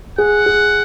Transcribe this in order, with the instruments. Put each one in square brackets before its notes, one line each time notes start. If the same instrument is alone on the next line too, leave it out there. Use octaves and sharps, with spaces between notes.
[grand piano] G#4 [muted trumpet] F#5
[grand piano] G#4